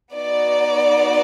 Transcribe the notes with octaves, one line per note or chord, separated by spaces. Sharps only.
B3 D#4 F#4 D5